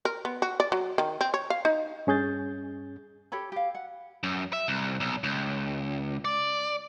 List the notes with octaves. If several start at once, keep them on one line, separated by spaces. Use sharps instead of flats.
A#4
B3
F#4
D5
F#3
D#3
C4
C#5
F5
D#4
G2 C#4 G#4 G6 A6
G4 A4 C#5 B5
G4 F5
F#5
F#2
E5
C2
B1
C#2
D5